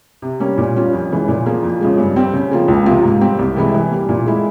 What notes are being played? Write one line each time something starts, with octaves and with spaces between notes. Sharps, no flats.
C3
G3 A#3 C#4
A#2
G3 C#4 F4
F2
C#3 E3 G#3
A#2
F3 A#3 F4 G#4
F2
C#3 F3 G#3
G2
G3 C4 G4
C#3
F3 A#3 F4 G#4
C#2
C3 F3 A#3 F4
G#2
G3 C4 G4
C2
C3 E3 G#3 E4
E3
G3 A#3
A#2
G#3 E4 G#4